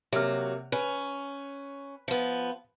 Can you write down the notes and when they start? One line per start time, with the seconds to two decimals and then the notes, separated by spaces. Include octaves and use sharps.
0.13 C3 F#3 A#3 F6
0.72 C#4 B4
2.08 F3 B3